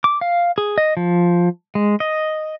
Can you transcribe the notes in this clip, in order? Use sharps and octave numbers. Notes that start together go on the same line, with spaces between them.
D6
F5
G#4
D#5
F3
G#3
D#5